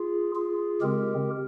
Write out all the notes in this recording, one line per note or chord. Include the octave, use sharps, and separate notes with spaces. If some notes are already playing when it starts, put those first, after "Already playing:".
Already playing: F4 G#4
F4 G#4
C#3 G#3 C4 G4 A#4